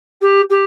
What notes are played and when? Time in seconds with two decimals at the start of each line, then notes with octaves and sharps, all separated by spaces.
0.21 G4
0.50 G4